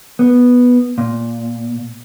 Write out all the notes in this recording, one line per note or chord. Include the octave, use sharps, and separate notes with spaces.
B3
A#2